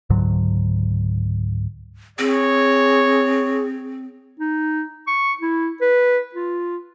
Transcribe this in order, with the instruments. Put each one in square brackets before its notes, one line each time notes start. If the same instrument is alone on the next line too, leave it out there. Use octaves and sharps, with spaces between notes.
[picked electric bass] C#2 G#2 D3 F#3
[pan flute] C4 [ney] G#4 [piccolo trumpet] C#5
[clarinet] D#4
C#6
E4
B4
F4